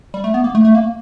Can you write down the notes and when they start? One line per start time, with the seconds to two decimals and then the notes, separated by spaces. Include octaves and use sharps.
0.14 G3
0.24 A3
0.34 B3
0.44 A#3
0.55 A3
0.65 A3
0.75 A#3